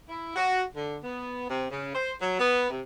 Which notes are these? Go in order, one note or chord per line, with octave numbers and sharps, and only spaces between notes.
E4
F#4
D3
B3
C3
C#3
C5
F#3
B3
C3